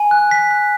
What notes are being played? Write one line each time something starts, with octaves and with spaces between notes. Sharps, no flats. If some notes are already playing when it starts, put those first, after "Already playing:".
Already playing: G#5
F#6
B6
F#6